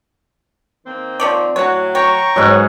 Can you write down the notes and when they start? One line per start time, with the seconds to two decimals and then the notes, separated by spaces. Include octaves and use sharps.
0.86 D#3 A#3 C4
1.20 F3 C#5 D5
1.56 A2 F#3 F#4 C#5
1.95 C#5 G5 A#5 C#6
2.36 G#2 F#3 C#4 B4